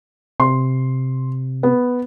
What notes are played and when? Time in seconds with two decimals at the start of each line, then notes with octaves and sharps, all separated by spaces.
0.40 C3 C6
1.63 B3